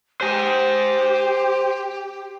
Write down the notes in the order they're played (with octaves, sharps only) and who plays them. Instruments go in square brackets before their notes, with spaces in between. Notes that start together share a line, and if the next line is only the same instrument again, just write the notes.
[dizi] G4 [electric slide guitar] C5 G#5